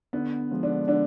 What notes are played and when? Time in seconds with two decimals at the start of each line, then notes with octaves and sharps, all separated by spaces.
0.13 D3 B3
0.51 F3 G#3
0.63 D3 D4
0.88 D3 D4